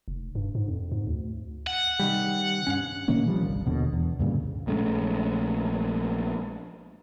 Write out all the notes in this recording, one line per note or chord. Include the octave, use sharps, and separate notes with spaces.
F1
G2
G#2
F2
G#2
D2
F#5
C3 D#3 G3
G2 C#4
A#2 D#3 A#3 C#4
D#3 F3 G3
G1 C2
D#2 B2 D3
E2
D2 G2 A#2 C#3
A#1 G#3 A3 C#4